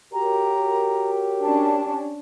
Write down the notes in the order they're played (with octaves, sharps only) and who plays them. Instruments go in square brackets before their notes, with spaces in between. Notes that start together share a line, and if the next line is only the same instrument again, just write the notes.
[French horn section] F#4 A#4 C#5 [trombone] G4 [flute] A#5
[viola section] C#4 D4 [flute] A5